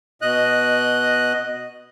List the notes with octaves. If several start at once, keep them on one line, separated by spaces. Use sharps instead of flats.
B2 D#5 F#6